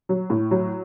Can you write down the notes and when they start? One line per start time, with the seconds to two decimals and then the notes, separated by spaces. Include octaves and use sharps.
0.09 F#3
0.30 A2
0.51 F#3